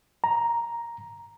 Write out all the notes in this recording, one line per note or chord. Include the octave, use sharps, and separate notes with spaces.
A#5